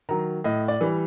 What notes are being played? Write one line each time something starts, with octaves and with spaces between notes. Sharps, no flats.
D#3 F#3 A#5
A2 D#5
D5
E3 G3